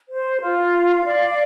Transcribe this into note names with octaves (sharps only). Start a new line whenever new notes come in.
C5
F4
F5
D5